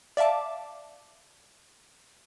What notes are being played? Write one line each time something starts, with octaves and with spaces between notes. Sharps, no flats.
D5 E5 F5 A5 D6